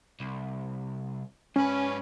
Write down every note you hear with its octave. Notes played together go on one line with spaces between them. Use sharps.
C2
G#2 C#4 B4